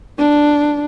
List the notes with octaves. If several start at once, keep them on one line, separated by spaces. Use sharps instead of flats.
D4